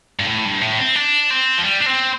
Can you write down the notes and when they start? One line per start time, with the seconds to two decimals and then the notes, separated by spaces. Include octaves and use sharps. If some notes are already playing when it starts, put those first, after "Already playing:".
0.19 G2
0.27 A2
0.45 G2
0.61 A2
0.78 C4
0.95 D4
1.30 C4
1.58 F3
1.63 G3
1.80 D4
1.86 C4